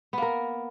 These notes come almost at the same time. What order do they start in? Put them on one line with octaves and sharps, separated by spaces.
B3 A#3 A#4